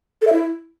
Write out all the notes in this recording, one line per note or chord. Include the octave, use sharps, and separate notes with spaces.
A4
E5
E4